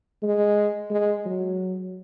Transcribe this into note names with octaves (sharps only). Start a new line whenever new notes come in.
G#3
G#3
F#3